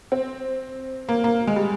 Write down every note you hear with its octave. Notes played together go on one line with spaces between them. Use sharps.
C4
A#3
A#3
G#3
G3